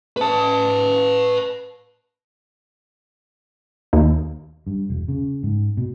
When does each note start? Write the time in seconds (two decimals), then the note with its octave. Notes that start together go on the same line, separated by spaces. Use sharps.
0.17 B4 A5
3.93 D#2
4.67 G2
4.90 E1
5.08 C#3
5.43 G#2
5.77 B2